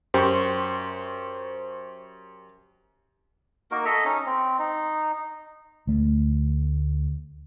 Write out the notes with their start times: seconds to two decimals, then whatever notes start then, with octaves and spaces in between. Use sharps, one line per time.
0.14 F#2 G4 C5 C#6
3.71 A#3 D#4 F#4 A#4
3.85 A4 D#5 E5 A#5
4.05 C#4 D#4
4.26 C4
4.59 D#4
5.87 D2 A3